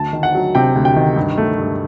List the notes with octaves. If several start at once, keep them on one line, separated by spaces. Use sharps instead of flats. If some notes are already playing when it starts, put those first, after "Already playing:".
Already playing: D2 A5
D#3
F#5
F#3
C3 G5
D2
G5
D#3
G2
A3
G2